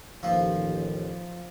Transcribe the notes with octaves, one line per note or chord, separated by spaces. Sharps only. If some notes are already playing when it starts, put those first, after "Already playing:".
A1 D#2 F3